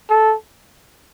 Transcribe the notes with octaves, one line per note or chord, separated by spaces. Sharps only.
A4